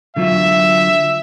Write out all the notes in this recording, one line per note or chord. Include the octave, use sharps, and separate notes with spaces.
D3 F#3 F4 E5